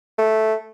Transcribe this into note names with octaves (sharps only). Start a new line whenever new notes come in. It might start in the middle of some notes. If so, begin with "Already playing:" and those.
A3